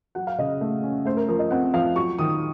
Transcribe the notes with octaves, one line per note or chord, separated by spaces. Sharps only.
F#3 F#5
F5
C#3 D#5
A3
C#4
A3 C5
A#4
F3 A#4
D#5
C4 F#5
F3 F5
F#3 C#6
D#3 D#6